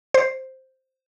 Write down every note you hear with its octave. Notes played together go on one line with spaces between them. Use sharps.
C5